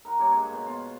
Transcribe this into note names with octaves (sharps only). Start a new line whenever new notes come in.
A#4 F#5 B5
G2 A#3 C#5
G#3
B2
F4